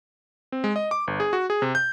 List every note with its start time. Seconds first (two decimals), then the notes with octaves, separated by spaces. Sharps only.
0.52 C4
0.64 G#3
0.76 D#5
0.91 D6
1.07 G1
1.20 G#4
1.33 F#4
1.50 G#4
1.62 C3
1.75 G6